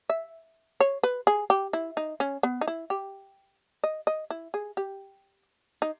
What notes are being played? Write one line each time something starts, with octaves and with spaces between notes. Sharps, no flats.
E5
C#5
B4
G#4
G4
E4
D#4
C#4
B3
D#4
E4
G4
D#5
D#5
E4
G#4
G4
D#4